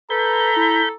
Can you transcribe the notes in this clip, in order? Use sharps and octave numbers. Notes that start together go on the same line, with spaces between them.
A4 B4 A#5 B5 G6
E4